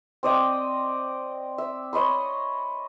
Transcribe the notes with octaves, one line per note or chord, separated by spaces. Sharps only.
C4 D5 D#5 G5
E5
C#5 D#5 B5 C6